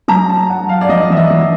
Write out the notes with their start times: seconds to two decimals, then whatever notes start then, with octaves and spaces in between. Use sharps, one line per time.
0.08 F#3 A#5
0.29 A5
0.50 F#5
0.69 F5
0.81 D5
0.89 F3 D#5
1.10 E3 E5
1.17 D#5
1.30 E3